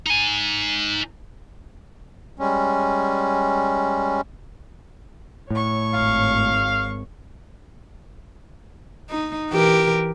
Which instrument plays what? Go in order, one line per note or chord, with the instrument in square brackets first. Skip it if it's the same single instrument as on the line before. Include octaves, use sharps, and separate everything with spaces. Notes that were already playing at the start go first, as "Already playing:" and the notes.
[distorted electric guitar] D#4 G#5
[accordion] G3 G#3 C#4
[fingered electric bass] A2 [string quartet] C#5 C#6
[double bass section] G#1 [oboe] F5
[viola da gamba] D#4
E3 G4 A#4